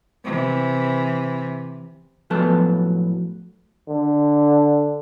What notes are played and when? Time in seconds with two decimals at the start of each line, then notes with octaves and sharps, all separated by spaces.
0.24 C3 E3
2.30 A2 F3 F#3 B3 A4 A5
3.90 D3